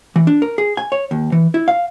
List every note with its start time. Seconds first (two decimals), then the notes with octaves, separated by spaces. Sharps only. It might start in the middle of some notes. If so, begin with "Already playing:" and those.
0.16 E3
0.27 D4
0.42 A#4
0.58 G#4
0.77 G#5
0.92 C#5
1.11 D#2
1.32 E3
1.54 E4
1.68 F5